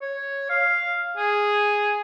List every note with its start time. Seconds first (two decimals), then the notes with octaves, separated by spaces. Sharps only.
0.02 C#5
0.50 F5
1.17 G#4